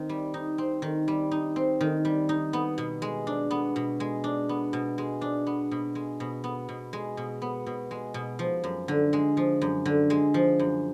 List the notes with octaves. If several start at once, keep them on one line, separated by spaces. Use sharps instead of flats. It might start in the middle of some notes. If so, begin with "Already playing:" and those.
Already playing: D#3 C4
G3
D#4
C4
D#3
G3
D#4
C4
D#3
G3
D#4
B3
B2
G#3
D4
B3
B2
G#3
D4
B3
B2
G#3
D4
B3
B2
G#3
B2
B3
B2
G#3
B2
B3
B2
G#3
B2
F3
F#2
D3
G#3
F3
F#2
D3
G#3
F3
F#2